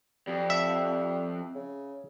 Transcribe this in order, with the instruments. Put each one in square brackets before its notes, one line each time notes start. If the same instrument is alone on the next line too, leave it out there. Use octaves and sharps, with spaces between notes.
[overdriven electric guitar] F2 [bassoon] G3
[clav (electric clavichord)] E5
[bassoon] C#3